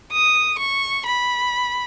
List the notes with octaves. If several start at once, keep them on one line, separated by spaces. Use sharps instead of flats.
D#6
C#6
B5